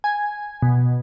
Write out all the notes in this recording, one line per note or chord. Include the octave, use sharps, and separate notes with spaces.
G#5
B2